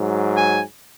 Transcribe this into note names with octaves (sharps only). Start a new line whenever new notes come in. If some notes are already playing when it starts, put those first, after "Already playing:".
Already playing: G#2 F#3
G#5